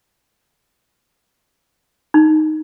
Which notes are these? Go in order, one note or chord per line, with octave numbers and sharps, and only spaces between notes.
D#4